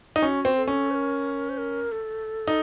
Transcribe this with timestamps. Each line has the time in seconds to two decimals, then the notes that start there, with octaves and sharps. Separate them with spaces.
0.16 D#4
0.22 C#4 F#4
0.45 C4
0.56 A4
0.68 C#4
0.91 C5
0.95 A#4
1.49 C5
1.58 A#4
1.92 A4
2.48 D#4